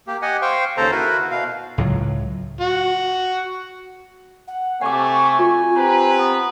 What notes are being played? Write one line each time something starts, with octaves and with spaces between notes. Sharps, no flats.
A#3 G4
G4 D#5 F#5 G#5
C5 F5 G5 C6 C#6
D#2 C#3 A4 C5 A#5
E4 F#4 A#4 B4
B2 F5
C#2 A2 F#3
F#4
F#5
C3 A3 F#5 G#5 C#6 D6
F4
C4 G4 B4 A#5
B3